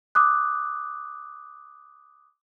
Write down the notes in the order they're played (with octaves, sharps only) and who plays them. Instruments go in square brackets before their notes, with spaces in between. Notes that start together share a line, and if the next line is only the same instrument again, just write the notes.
[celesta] D6 D#6 F#6